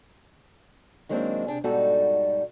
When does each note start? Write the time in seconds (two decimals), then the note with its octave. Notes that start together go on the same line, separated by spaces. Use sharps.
1.09 D#3 F#3 G#3 A#3 C4 D4
1.46 C3 D4 G#4
1.64 G#2 B2 G3 D#4 F#4 A4